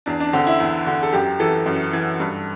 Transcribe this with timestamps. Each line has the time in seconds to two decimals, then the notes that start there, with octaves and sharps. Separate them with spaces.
0.06 E2 D4
0.20 D4
0.33 D3 C4
0.47 E4
0.60 E2
0.87 D3
1.03 A4
1.13 F#2 G4
1.40 E3 A4
1.66 F#2
1.93 E3
2.20 G2